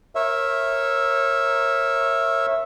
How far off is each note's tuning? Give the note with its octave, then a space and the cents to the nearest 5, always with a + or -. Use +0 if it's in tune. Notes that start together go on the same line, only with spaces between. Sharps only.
A#4 +0 C#5 -25 E5 +0